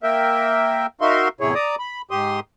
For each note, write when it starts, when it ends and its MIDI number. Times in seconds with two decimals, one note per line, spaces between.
0.03 0.86 58
0.03 0.86 70
0.03 0.86 76
0.03 0.86 79
1.01 1.28 63
1.01 1.28 66
1.01 1.28 70
1.01 1.28 76
1.01 1.28 77
1.01 1.28 84
1.41 1.54 40
1.41 1.54 45
1.41 1.54 48
1.41 1.54 64
1.41 1.54 68
1.41 1.54 73
1.55 1.76 74
1.55 1.76 82
1.55 1.76 86
1.55 1.76 87
1.79 2.02 83
2.11 2.40 44
2.11 2.40 67
2.11 2.40 84
2.11 2.40 87